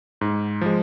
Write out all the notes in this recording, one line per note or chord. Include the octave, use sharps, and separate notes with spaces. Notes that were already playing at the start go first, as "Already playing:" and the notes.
G#2
F3 G#3